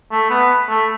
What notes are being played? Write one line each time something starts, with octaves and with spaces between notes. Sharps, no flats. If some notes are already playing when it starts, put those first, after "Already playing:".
A3
B3
A3